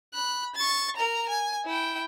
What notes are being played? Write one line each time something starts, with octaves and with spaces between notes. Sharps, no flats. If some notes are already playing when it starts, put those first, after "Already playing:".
B5 F#6
C#6 A6
A#4 A#5
G#5
E4 G5